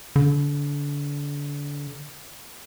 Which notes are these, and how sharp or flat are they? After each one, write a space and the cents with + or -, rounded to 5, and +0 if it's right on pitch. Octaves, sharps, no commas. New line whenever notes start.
D3 -30